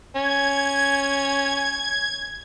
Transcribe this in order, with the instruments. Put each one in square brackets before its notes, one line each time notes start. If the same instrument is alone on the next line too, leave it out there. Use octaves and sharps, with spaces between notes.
[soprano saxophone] C#4 [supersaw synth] G#6